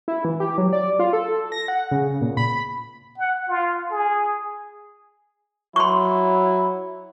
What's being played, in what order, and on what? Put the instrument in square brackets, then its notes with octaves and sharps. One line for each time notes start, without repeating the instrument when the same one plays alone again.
[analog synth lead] E4
E3
G4
F#3
D5
F4
A4
A#6
F#5
C#3
A#2
B5
[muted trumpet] F#5
F4
G#4
[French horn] F#3 [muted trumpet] E4 [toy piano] C6 C#6